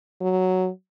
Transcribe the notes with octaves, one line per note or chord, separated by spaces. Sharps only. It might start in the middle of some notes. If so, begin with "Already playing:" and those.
F#3